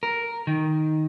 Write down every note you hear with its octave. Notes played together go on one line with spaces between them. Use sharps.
A#4
D#3